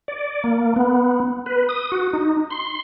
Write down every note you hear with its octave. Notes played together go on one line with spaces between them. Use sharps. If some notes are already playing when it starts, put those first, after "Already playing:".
D5
A#3
B3
B4
D#6
F#4
D#4
C6